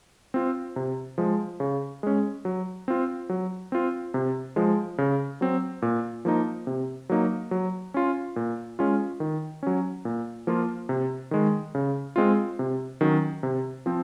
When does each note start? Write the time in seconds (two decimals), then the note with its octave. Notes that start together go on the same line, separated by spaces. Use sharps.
0.34 C4 F4
0.76 C3
1.18 F3 G#3
1.60 C#3
2.03 G#3 C#4
2.45 F#3
2.88 C4 F4
3.29 F#3
3.72 C4 F4
4.14 C3
4.56 F3 G#3
4.98 C#3
5.41 F#3 C4
5.82 A#2
6.25 F3 A#3 D#4
6.67 C3
7.09 F#3 A#3 D#4
7.51 F#3
7.94 C#4 F4
8.36 A#2
8.79 G#3 C#4 F4
9.20 D#3
9.63 F#3 C#4
10.05 A#2
10.47 F3 A#3 F4
10.89 C3
11.31 D#3 G#3
11.75 C#3
12.16 G#3 C4 F4
12.59 C3
13.01 D#3 F#3 C#4
13.43 C3
13.86 F3 C4